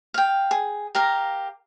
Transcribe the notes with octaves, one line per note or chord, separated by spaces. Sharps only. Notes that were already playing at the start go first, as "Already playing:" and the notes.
F5 G5
G#4
G4 A#4 F5 A#5